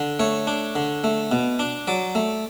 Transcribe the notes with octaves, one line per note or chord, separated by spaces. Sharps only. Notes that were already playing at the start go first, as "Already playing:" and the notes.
Already playing: D3
A3 C#5
D4
D3
A3
B2
D4
F#3 D5
A3